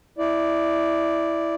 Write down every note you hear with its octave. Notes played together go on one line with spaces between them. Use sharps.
E4 D5